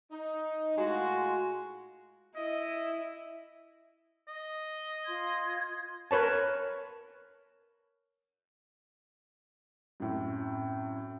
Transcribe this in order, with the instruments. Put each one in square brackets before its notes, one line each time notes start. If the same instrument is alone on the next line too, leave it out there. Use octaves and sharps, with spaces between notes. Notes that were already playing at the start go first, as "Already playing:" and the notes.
[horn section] D#4
A2 G#3 F4 F#4
[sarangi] E4 [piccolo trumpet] D#5
[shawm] D#5
[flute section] F4 C6 G#6
[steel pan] A#4 B4 C#5 A5
[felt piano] F#2 A2 C4